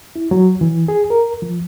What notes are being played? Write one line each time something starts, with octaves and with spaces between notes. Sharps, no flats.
E4
F#3
E3
G#4
A#4
F3